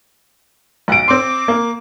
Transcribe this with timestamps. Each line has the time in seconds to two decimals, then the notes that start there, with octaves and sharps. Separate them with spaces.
0.88 B1 F#5 D7
1.08 C4 C6 D6
1.48 A#3